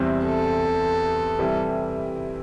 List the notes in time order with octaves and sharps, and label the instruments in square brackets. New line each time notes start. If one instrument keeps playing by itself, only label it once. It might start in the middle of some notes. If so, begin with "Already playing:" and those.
Already playing: [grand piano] E2 C3 G3 C4 E4
[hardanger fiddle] A4
[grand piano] C3 E3 G3 E4